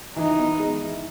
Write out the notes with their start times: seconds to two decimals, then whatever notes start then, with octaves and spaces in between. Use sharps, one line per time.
0.16 E3 D#4
0.39 B3
0.60 G#3
0.82 E3